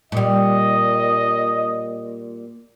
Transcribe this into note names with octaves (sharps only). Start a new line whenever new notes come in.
A#2 G3 D#5